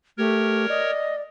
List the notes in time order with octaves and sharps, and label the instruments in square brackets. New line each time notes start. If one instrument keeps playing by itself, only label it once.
[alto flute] A3 [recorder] G4 [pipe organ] A#4 C#5
[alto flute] D5 [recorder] D#5